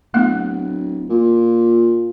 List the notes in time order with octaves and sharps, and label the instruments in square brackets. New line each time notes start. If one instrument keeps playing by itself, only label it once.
[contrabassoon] D1 [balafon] A3 B3 F#5
[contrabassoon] A#2